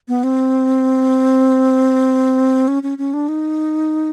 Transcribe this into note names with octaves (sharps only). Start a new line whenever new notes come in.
B3
C4
C#4
C#4
C#4
D4
D#4